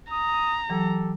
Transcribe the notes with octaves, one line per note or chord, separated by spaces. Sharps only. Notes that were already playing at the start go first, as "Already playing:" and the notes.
A#5 D#6
E3 F#3 G4 A4